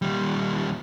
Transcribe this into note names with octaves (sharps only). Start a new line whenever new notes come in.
D#2 G3